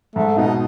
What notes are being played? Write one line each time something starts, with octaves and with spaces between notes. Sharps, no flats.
G#2 A3
B2 D#4